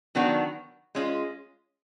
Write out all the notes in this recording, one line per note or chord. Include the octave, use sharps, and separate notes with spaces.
D#3 F#3 B3 D4 F#4
G#3 C#4 F4